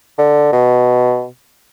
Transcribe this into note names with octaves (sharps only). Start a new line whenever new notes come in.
D3
B2